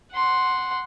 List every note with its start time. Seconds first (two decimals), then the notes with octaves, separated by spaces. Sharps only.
0.13 F#5 C6